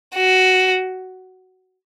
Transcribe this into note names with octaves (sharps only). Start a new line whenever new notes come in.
F#4